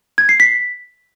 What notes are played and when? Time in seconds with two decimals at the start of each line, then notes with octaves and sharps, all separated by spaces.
0.18 G#6
0.29 C7
0.40 B6